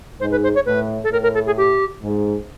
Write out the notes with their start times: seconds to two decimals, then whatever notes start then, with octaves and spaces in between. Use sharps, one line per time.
0.20 G#2 C5
0.31 B4
0.43 C5
0.55 C#5
0.66 A2 B4
1.04 A4
1.11 A2 A#4
1.23 A#4
1.34 A4
1.46 G#4
1.57 G4
2.02 G#2